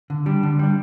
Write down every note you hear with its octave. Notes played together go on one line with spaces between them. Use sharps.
D3
G3 D4
D3
G3 D4